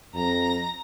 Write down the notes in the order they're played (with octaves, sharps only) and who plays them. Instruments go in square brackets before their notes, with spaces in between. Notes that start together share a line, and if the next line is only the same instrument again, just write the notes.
[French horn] F2 [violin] A#5 A#6